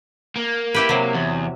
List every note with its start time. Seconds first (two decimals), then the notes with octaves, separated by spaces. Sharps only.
0.36 A#3
0.74 E4 G4 B4
0.89 C3 F#3
1.14 E2